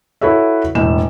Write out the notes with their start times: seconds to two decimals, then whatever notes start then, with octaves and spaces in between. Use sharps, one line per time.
0.21 E4 F#4 A4 B4 C#5 E5
0.75 E1 A2 E7